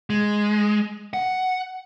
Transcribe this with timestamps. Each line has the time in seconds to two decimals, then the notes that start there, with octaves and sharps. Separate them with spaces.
0.10 G#3
1.14 F#5